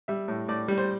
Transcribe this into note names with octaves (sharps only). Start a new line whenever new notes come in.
G3 E5
A2
A2 D5
G3
C5